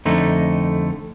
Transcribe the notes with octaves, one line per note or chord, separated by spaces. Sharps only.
F2 D3 A3 D#4